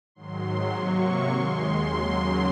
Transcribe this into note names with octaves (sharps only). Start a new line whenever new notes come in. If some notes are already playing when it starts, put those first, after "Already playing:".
G#2 D#3 F#3 C6
C3 F#3 A#3 C#6
D#2 D#3 G#3 C6
D#2 C#3 F#3 A#3